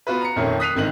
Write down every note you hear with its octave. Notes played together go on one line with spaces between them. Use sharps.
B3 F4 F#4 B4
A#5 C#7
F2 A#2 D#3 A3 A#3 C#4
D#6 F#6 B6 C7 D#7 F7
G#1 D3 D#3 C4 D#5 F#7